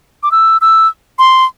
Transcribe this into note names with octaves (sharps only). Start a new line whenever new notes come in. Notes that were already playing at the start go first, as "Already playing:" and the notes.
D6
E6
E6
C6